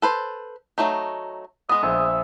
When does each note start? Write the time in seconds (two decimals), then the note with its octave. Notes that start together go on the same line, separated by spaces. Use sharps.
0.02 A4 B4 C5
0.78 F#3 A3 D#4
1.69 G#3 B3 D#5 D#6
1.83 A#1 E5